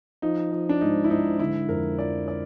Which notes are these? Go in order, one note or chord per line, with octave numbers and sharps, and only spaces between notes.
F3 D#4
F3
D4
G#2 D#4
E4
G#2 D#4
D3 E4
F2 A#4
F3 D5
D5